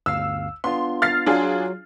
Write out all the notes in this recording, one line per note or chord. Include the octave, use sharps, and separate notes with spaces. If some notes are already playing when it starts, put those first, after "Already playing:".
G1 D2 F5 E6
B3 D4 F4 C6
F6 A6 C7
F#3 D4 F4 G#4